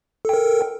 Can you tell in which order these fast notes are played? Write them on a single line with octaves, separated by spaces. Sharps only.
A4 G5 A#4